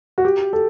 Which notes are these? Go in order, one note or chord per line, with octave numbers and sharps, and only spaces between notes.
F#4
G4
A4